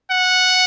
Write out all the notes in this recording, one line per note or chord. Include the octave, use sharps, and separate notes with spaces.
F#5